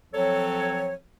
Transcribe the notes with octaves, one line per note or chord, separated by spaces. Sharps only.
F3 F#3 C4 A4 C#5